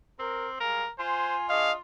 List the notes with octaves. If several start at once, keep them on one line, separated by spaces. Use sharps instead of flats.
C4 A#4
G3 G#3 A#4 F5
F4 C5 G#5
D4 G#4 D#5 F5 C#6